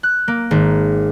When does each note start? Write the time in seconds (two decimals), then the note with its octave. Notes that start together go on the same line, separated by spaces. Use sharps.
0.03 F#6
0.28 A#3
0.51 G#1